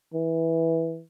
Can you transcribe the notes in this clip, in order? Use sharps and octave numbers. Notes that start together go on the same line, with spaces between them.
E3